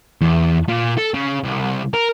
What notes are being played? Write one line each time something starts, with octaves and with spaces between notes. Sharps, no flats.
E2
A#2
A4
C#3
C2
A#4